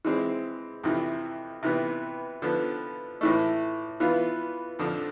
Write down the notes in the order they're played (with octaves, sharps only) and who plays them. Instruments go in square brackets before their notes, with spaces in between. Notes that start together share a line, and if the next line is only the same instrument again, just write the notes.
[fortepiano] E3 G#3 C4
F2 C3 E3
C3 E3 B3
D3 F3 B3
A2 E3 A3
E3 B3 F4
F2 D3 F3